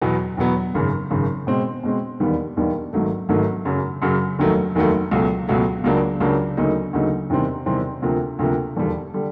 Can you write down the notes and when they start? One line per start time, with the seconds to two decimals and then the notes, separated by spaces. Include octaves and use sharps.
0.01 E2 B2 F#3 B3
0.37 E2 B2 F#3 B3
0.74 G#1 F#2 C#3
1.11 G#1 F#2 C#3
1.47 B2 G#3 C4
1.83 B2 G#3 C4
2.20 E1 D#2 D#3 G3 B3
2.57 E1 D#2 D#3 G3 B3
2.93 G#1 G#2 D#3 F#3 A3
3.29 G#1 G#2 D#3 F#3 A3
3.65 F#2 C#3 F#3
4.02 F#2 C#3 F#3
4.38 F1 D#2 D#3 F#3 A3
4.75 F1 D#2 D#3 F#3 A3
5.11 C#2 B2 F#3 A3
5.48 C#2 B2 F#3 A3
5.84 C#2 C#3 F#3 A#3 D4
6.20 C#2 C#3 F#3 A#3 D4
6.57 D2 C#3 F#3 A#3 D#4
6.93 D2 C#3 F#3 A#3 D#4
7.30 E2 C3 D#3 G3 C4
7.66 E2 C3 D#3 G3 C4
8.02 D2 C3 F3 A#3
8.39 D2 C3 F3 A#3
8.76 E1 D#2 D3 G3
9.14 D3 G3